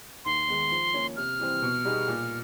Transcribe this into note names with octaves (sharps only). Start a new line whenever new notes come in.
D#2 C6
D#3 G#3 B3
F3
A#3 C#4
C3 F6
E3 G3 C4
B2
G3 B3 D#4 G#4
A#2